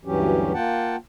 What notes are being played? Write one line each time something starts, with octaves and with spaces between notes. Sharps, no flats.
D2 G2 E3 F#3 C#4 G4
A#3 F4 F#5 G5 A5